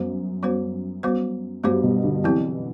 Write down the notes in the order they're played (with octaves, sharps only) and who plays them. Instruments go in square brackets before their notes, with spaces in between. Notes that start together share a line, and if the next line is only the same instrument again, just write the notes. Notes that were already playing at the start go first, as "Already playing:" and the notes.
Already playing: [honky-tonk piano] F#2 [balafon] G3 B3 F#4 C5
[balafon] G3 B3 F#4 C5
G3 B3 F#4 C5
[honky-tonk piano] G2 [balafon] G3 B3 F#4 C5
[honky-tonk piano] B2
D3
[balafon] D3 F#3 C4 G4 [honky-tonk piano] E3